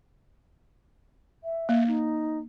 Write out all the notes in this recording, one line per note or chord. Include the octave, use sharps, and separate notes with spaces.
E5
A#3
D#4